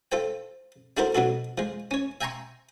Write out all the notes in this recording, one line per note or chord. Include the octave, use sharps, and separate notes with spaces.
F4 A4 C5 G5
D4 E4 F#4 A4 A#4 C5
B2 F#3 D4 F#4 A4
F3 G#3
C#4 C#5
E5 G5 G#5 A#5 C6 C#6